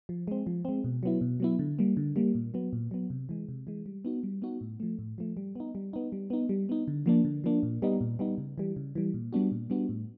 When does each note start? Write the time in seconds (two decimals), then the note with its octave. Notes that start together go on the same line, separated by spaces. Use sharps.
0.09 F3
0.28 G#3 C4
0.47 F3
0.65 G#3 C4
0.84 B2
1.03 F#3 B3 E4
1.21 B2
1.40 F#3 B3 E4
1.59 D3
1.79 G3 A#3
1.97 D3
2.16 G3 A#3
2.35 A#2
2.54 F#3 B3
2.73 A#2
2.91 F#3 B3
3.10 C3
3.29 E3 G#3
3.49 C3
3.67 E3 G#3
3.86 G3
4.05 B3 D#4 F#4
4.23 G3
4.42 B3 D#4 F#4
4.61 A2
4.80 F3 A3
4.99 A2
5.18 F3 A3
5.37 G3
5.55 B3 D#4
5.75 G3
5.93 B3 D#4
6.12 G3
6.30 B3 D#4
6.49 G3
6.69 B3 D#4
6.88 D3
7.06 F3 A#3 D4
7.25 D3
7.44 F3 A#3 D4
7.63 A#2
7.82 G3 B3 D#4
8.01 A#2
8.19 G3 B3 D#4
8.38 C#3
8.58 E3 G3
8.76 C#3
8.95 E3 G3
9.14 A#2
9.33 G3 B3 D4 F#4
9.52 A#2
9.70 G3 B3 D4 F#4
9.89 A2